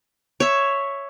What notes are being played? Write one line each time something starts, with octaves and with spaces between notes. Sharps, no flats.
C#5 E5